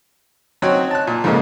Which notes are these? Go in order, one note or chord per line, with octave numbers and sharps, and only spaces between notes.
F#3 C4 C#4 D#4 F#4 C#5
A5 F#6
A#2
F2 G#2 C#3 F3 A#3 D#4